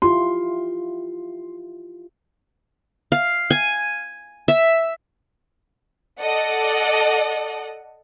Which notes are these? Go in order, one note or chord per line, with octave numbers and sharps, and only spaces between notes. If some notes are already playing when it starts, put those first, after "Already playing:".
E4 F4 G4 C6
F5
G#5
E5
A4 D5 D#5 F#5